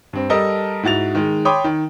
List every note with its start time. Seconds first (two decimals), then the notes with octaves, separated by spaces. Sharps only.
0.13 G2 C4
0.30 G3 A4 A#4 D#5 A5
0.83 G#2 E4 F#4 A6 F7
1.15 D#3 G#3
1.45 C#5 G5 B5 C6 D6 D#6
1.64 D#3